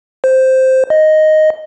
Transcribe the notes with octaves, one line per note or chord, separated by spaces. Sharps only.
C5
D#5